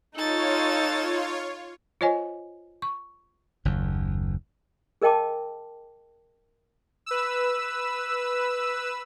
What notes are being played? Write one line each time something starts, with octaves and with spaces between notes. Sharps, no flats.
D#4 F4 A4 C#5 A6
F4 C5 C#5 D#5 G#5
C#6
F#1 D#2
G#4 A#4 D#5 G5 A5 D6
B4 E6